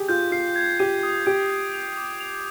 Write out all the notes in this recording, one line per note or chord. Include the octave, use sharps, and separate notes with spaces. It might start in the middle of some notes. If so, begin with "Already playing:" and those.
Already playing: G4 G#4
F4 G6
F4 C7
G#6
G4 D#7
D#6
G4 D7
G#6
F7
D6
F7